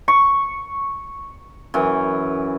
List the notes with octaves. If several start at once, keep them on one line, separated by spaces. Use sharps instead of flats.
C#6
F#2 E3